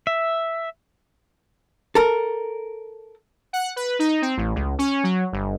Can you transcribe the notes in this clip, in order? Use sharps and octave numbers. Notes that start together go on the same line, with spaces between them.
E5
A4 A#4
F#5
B4
D#4
C4
A1
C#2
C#4
F#3
G1